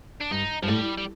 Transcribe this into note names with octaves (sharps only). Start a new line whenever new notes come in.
D4
G2 D#4
G2 F3
A2 G3
G3